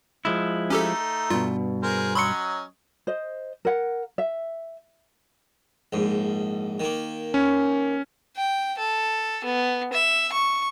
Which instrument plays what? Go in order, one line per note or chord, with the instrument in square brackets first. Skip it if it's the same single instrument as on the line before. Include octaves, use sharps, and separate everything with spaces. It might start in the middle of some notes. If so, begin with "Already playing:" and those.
[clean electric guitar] F3 G#3 E4
[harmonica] A3 D#4 [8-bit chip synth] C#4 G4 A4
[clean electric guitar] G2 B2 [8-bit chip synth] F4
[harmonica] G#4 A#4 C5
[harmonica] F#3 C#4 D#5 [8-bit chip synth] B5 C6 C#7
[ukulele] C5 D#5
A#4 F#5
E5
[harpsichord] A#1 G#2
D#3 A#3
[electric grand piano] C#4
[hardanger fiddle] G5
A4
B3
E5
C#6